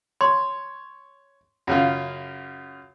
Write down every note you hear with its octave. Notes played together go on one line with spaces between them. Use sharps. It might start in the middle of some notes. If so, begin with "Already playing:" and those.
C#5 C6
F#2 C#3 F4